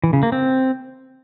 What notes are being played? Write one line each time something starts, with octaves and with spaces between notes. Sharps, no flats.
E3
C#3
A#3
C4